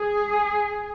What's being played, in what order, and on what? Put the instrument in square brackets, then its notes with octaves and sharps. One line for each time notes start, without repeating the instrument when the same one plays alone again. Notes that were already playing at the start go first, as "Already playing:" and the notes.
Already playing: [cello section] G#4